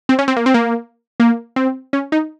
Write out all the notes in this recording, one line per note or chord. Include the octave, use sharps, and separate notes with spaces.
C4
C#4
C4
A#3
C4
A#3
A#3
C4
C#4
D#4